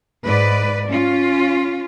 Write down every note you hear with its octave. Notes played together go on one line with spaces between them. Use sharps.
G#2 B4 D5
C#4 F4